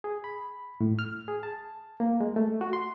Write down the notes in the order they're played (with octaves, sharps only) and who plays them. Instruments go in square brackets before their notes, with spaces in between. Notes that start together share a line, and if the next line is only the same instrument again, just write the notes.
[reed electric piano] G#4
B5
A2
F6
G#4
A5
A#3
G#3
A3
F#4
C6